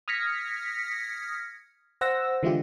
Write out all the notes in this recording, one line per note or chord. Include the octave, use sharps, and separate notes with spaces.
D#6 F6 G#6 A#6 B6 C#7
C5 F#5 E6 A#6
D3 E3 G#3 E4 F4 G4